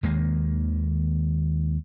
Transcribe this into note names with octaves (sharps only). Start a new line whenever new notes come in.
D#2 D#3 G#3 A#3